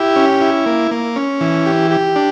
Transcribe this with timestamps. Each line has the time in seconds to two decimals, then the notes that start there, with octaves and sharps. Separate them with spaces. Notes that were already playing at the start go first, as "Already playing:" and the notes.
Already playing: E4 G4
0.16 C#4
0.41 E4
0.66 A#3
0.91 A#3
1.16 C#4
1.41 E3
1.66 G4
1.91 G4
2.16 D4